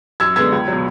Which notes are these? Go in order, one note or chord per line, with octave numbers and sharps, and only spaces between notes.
F#2 E6 G#6
D3 G#3 B3 E6 G#6
C#2
B2 F#3